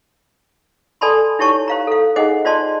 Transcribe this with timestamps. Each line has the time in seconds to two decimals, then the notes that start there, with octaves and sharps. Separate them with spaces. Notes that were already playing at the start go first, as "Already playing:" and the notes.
1.01 A4 D5 G#5 A5 B5 C6
1.39 D#4 E4 G4 C#5 A5 C#6
1.68 C5 F5 A#5
1.87 A4 F5
2.16 D#4 G#4 C5 D#5 F#5 G#5
2.45 F4 C5 D5 D#5 A5 C6